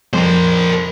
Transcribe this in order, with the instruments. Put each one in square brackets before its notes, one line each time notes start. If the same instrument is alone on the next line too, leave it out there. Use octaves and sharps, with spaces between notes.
[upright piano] F2 [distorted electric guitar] A#4 C5